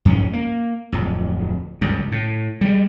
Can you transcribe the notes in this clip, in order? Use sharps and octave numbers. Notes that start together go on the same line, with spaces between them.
F2 G#2 C#4
A#3
D1 F2
G1 C#2 F#2
A2
G3 G#3